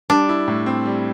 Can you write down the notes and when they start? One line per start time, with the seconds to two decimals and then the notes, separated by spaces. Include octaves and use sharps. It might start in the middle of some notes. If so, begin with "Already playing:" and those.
0.10 G3 D4
0.29 E4
0.48 A2
0.66 C4
0.85 G3